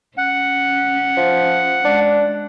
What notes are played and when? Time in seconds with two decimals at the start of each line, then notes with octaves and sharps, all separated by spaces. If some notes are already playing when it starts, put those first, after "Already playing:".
0.18 C#4 F#5
1.17 F3
1.85 G#3 D4